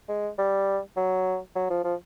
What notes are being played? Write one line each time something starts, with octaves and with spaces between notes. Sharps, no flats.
G#3
G3
F#3
F#3
F3
F3